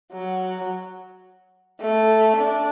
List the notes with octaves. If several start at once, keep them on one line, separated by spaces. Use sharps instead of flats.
F#3
A3
D4